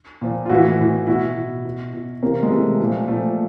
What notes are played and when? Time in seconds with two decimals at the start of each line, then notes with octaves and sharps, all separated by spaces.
0.21 A#2 F3
0.46 F4
0.49 A2 E3 E4 F#4
0.79 A2 E3
1.07 B2 E4 F#4
1.36 B2
1.65 B2
1.93 B2
2.23 C3 E3 A#3 C4
2.43 G#3
2.50 C3 E3 A3
2.80 A#2 F3
3.08 A#2 F3 A3